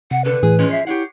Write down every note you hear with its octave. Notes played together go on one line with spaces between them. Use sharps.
C3 F#5
A2 D3 A4 B4
A2 E3 G#4
F3 G#3 C#4
E5 C7
E4 G4 C#5 F#5